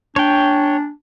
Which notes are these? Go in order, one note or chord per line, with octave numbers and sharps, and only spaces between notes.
D4 C#5 G5